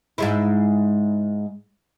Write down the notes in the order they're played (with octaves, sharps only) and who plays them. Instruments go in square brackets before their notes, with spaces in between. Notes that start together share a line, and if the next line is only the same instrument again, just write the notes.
[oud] G#2 G#3 E4